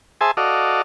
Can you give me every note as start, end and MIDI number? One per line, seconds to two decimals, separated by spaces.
0.21 0.31 68
0.21 0.31 72
0.21 0.31 76
0.21 0.31 80
0.21 0.31 81
0.37 0.82 66
0.37 0.82 69
0.37 0.82 74
0.37 0.82 75
0.37 0.82 77